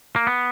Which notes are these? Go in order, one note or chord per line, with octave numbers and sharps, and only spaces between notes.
A#3
B3